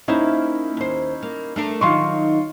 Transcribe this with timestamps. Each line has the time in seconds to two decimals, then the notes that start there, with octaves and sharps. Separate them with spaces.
0.08 A#3 C#4 D#4 E4 C5 E5
0.77 D#2 C5
1.23 A#3
1.56 A3 D4 A#4
1.81 D#3 F#3 D#4 F4 C6 C#6